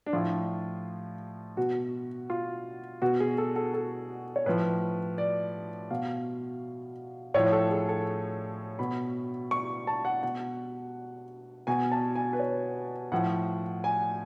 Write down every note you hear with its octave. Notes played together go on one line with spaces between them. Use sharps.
D4
A2 F3 F4
B2 F#4
F4
B2 F#4
G#4
A4
A4
A4
C#5
A2 F3 B4
D5
B2 F5
A2 F3 C#5
A4
G#4
A4
B2 B5
C#6
A5
F#5
B2 F#5
B2 G#5
A5
G#5
B4
C#5
A2 F3 F#5
G#5